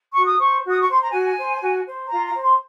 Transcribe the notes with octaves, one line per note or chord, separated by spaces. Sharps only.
F#4 C#6
D#6
C5 C#6
F#4
D#6
C#6
C5 C6
A#5
F#4 G#5
C5
F#4
C5
F4 A#5
A#5
C5
C6